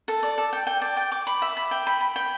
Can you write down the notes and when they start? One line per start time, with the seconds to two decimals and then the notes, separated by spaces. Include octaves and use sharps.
0.08 A4
0.23 D5
0.38 A4
0.53 G5
0.67 G5
0.82 D5
0.97 G5
1.12 D6
1.27 B5
1.42 E5
1.57 B5
1.71 G5
1.87 B5
2.01 B5
2.16 G5